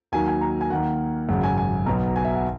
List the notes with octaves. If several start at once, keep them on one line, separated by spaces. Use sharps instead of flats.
D#2 D#3 F#3 A#3 G#5
G#5
A#5
G#5
D#2 D#3 A#3 F#5
G#1 F#2 C#3 F#5
G#5
G#5
B1 B2 F#3 A#5
G#5
E5
F#5